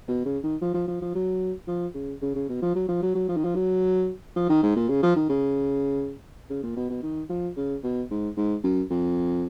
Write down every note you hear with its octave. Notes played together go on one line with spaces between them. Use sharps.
B2
C#3
D#3
F3
F3
F3
F3
F#3
F3
C#3
C#3
C#3
B2
F3
F#3
F3
F#3
F#3
F3
D#3
F3
F#3
F3
D#3
G#2
A#2
C#3
F3
D#3
C#3
C#3
A#2
B2
B2
D#3
F3
C#3
B2
G#2
G#2
F#2
F2